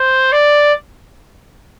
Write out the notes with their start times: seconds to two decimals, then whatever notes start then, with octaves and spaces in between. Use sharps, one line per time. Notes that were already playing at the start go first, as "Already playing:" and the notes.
Already playing: C5
0.32 D5